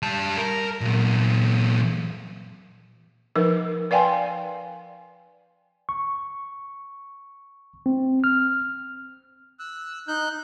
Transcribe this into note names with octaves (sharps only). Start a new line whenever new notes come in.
G3 A5
A#4
A#2 F#3
F3 D#4 A#4 B4
B4 D5 F5 G5 G#5 C6
C#6
C4
F6
E6 F#6
D#4 F#6 G6